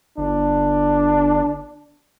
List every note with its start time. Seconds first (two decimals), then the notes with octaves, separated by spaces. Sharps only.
0.18 G1 D4